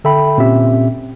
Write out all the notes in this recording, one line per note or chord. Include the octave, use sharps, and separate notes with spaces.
D3 A4 E5 G5 B5
A#2 C4 C#4 G4 E5